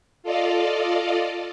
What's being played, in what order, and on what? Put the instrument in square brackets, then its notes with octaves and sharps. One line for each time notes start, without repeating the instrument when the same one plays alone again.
[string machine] F4 A4 D5 D#5 F5